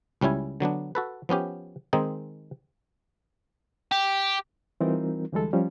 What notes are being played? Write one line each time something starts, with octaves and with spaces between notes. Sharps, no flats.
C#2 G3 C#4 E4 G#5
D3 F#3 B3 D4
F#4 A4 B4
F3 B3 C#4 G4
D#3 G#3 C4 D#4 G#4
G4
E3 G3 C4 D#4 F4 A#4
D2 E3 G3 G#3 A4
F3 G3 C#4